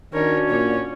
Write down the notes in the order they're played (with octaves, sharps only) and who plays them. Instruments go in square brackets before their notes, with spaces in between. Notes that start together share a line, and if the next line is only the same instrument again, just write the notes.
[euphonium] D#3 [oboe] C#4 [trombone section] D4 F#4 [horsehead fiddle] A#4 C#5
[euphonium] A#2 [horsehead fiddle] C#5 D5